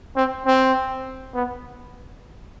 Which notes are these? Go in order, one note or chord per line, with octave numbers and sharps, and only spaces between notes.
C4
C4
B3